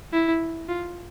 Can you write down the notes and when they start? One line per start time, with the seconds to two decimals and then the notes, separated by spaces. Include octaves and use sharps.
0.13 E4
0.68 F4